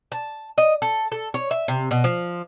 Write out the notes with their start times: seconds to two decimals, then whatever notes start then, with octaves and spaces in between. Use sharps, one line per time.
0.12 A5
0.58 D#5
0.82 A4
1.12 A4
1.34 C#5
1.51 E5
1.68 C3
1.91 B2
2.04 F3